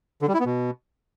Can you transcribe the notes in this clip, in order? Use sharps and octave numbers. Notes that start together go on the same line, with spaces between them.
D3
G3
E4
B3
B2